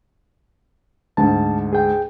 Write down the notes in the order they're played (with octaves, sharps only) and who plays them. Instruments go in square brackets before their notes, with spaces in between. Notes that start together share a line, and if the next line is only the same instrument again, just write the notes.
[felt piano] D2 G#2 [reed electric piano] A5
[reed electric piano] G#4 G5